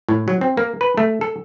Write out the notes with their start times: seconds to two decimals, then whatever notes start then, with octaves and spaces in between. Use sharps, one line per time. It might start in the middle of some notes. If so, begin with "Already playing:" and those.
0.09 A2
0.28 F#3
0.41 C4
0.57 A#3
0.81 B4
0.98 A3
1.21 A4